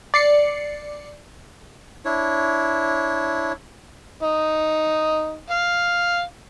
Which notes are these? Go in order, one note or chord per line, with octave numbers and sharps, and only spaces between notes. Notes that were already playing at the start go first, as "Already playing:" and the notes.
D5 C7 C#7
D4 E4 C#5
D#4
F5